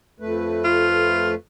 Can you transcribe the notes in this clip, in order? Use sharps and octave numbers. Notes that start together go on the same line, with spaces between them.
F2 A3 B4
F4